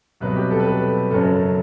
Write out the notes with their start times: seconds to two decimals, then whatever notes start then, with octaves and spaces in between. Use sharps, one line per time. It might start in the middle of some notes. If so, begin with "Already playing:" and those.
0.20 C2 B2 F#3 B4
0.36 G4
0.51 A4
0.60 B4
0.67 A4
1.11 F#1 F#2 F#3 A4